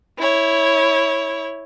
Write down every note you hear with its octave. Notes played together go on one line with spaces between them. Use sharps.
E4 C#5